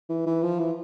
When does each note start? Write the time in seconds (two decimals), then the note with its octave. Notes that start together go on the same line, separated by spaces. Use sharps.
0.10 E3
0.26 E3
0.43 F3
0.60 E3